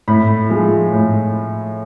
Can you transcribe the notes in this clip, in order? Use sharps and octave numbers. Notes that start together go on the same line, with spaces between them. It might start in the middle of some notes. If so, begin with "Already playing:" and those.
A2 B5
F3 G#3
A2